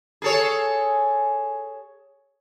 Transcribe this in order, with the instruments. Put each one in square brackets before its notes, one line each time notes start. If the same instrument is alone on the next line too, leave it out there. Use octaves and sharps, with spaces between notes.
[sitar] G#4 A4 C#5